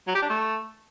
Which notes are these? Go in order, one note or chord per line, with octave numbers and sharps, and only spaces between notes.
F#3
G4
D4
A3